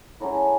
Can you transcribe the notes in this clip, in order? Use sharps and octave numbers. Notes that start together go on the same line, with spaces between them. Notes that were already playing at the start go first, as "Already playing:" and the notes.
C#3 F#3 A3 E4